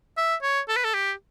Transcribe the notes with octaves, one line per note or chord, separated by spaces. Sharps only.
E5
C#5
A4
B4
A4
G4